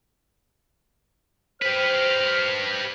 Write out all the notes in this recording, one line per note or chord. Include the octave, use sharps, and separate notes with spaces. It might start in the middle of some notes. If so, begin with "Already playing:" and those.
G4 B4 C5 F6